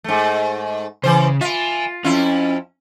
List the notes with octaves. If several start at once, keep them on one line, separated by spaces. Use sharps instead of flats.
G#2 A3
C#3 E3 C5
F4 E5 G#5
F2 C#4 E4 F4